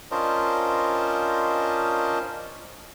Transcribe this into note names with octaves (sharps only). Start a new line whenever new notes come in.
C#4 D4 F4 A#4 C5 D#5